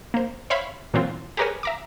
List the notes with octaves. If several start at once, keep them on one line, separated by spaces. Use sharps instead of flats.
A#3 C5
C5 C#5 E5 F5 B5
A#2 E3 F#3 C4 F4
G4 G#4 A#4 B4 C#5 G#5
E5 A#5 D6